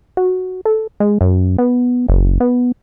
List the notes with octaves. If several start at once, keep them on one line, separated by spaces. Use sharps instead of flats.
F#4
A4
G#3
F#2
B3
F#1
B3